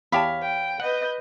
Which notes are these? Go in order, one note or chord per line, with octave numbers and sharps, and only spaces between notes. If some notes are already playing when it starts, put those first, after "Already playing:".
E2 G4 C#5 F5 A5 B5
G5
B4 D#5 F#5 G6